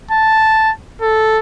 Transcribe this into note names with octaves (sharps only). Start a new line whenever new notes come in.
A5
A4